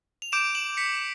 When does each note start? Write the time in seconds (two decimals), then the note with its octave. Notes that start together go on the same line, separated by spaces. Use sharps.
0.22 F7
0.32 D6 G6 D7 E7
0.55 E7 F#7
0.77 B6 C#7